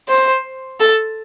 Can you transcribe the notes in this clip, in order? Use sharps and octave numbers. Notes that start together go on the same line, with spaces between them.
C5
A4